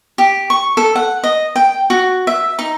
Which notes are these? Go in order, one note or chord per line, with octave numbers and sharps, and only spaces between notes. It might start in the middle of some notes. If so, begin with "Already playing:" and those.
G4
C#6
A4
F#5
D#5
G5
F#4
E5
D#4